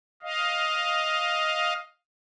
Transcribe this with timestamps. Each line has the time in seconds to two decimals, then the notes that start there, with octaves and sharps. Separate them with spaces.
0.23 D#5 F5